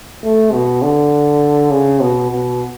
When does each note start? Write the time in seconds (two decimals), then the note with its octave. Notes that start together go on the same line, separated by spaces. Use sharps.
0.23 A3
0.52 B2
0.83 D3
1.71 C#3
2.01 B2
2.31 B2